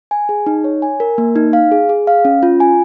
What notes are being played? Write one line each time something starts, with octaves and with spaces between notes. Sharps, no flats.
G#5
G#4
D#4
C#5
G#5
A#4
A#3
D#4
F5
G#4
G#4
F5
C#4
F4
G#5